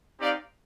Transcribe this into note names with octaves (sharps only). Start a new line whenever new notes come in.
C4 D#4 G4 D5 F5